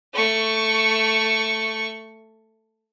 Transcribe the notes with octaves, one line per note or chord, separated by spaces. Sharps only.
A3 C#6